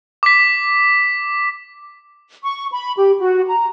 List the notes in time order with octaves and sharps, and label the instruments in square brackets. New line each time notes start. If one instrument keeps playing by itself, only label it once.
[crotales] D6 B6
[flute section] C#6
B5
G4
F#4
A#5